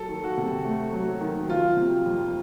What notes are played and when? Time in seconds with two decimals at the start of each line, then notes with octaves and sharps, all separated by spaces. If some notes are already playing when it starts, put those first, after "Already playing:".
Already playing: F#3 A4
0.09 D#3
0.24 F#4
0.37 C3
0.65 A3
0.93 F#3
1.21 D#3
1.49 F3 F4
1.77 C3
2.06 F2